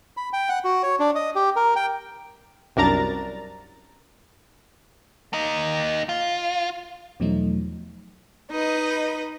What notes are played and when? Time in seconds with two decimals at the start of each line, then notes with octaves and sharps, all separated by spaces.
0.17 B5
0.33 G5
0.49 F#5
0.65 F#4
0.83 C#5
1.00 D4
1.15 D#5
1.36 G4
1.56 A#4
1.76 G5
2.76 C2 F#2 D4 A#4 A#5 A6
5.33 A#3 D#4
6.09 F4
7.20 E2 B2 F3 F#3 A3 D#4
8.52 D#4 B4 D#5